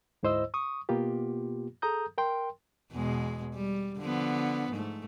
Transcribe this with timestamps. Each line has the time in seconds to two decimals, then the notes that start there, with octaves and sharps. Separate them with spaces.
0.23 D2 G#2 E4 C5 D#5 E6
0.54 C#6 D#6
0.89 B2 A#3 B3 F4 G4
1.82 G#4 A4 A#5 D#6 G6
2.18 A#4 G5 C6
2.92 E2 B2 G#3
3.54 G3
3.99 D3 F3 B3
4.72 G#2 A3